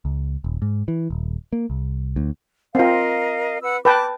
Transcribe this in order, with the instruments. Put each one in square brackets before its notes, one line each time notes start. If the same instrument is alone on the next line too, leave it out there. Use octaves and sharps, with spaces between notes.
[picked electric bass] C#2
D#1
G#2
E3
D#1
A#3
C2
D2
[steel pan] C4 F4 [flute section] A#4 D#5 F5
[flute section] B4 F#5 E6
[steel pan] B4 G5 A5 [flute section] D6